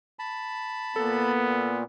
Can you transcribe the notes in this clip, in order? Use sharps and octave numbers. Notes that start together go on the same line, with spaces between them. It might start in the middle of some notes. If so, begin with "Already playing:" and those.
A5 B5
A#2 B3 A4